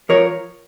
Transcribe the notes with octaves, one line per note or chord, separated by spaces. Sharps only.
F3 A#4 C#5